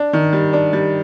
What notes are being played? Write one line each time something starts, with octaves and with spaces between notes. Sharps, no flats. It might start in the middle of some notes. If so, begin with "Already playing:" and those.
Already playing: D4
D#3
G3
D4
G3